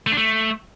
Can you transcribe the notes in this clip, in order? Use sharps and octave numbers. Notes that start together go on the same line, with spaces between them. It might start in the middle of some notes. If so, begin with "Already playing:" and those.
A3
D4
A3